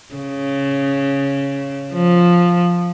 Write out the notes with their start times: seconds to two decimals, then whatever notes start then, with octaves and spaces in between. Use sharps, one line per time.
0.15 C#3
1.92 F3